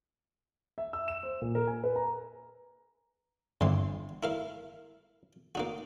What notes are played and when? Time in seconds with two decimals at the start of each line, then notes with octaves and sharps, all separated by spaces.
0.78 E5
0.93 E6
1.08 E7
1.23 C5
1.42 A#2
1.55 A#4
1.67 G#5
1.84 B4
1.96 A#5
3.61 G1 E2 C3 C6
4.23 E4 A#4 F5
5.55 A#3 D#4 F#4